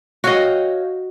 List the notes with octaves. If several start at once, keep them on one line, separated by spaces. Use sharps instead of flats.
F#4 C#5 D#5 F5 G5